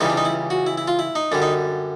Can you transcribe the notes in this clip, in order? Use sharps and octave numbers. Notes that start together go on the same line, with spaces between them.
C#2 C#3 E3 G3 D#4
D4
D#4
E4
F#4
E4
E4
F4
E4
D#4
F#2 D3 G3 D4
D#4